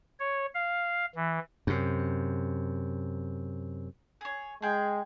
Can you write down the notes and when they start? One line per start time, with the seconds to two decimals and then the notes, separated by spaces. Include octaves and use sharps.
0.20 C#5
0.54 F5
1.15 E3
1.67 F#2 C3
4.21 G#4 C#5
4.62 G#3 G#4 G5